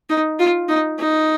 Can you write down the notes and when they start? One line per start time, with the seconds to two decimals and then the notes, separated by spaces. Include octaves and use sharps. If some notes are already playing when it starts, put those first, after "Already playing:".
0.10 D#4
0.39 F4
0.69 D#4
0.99 D#4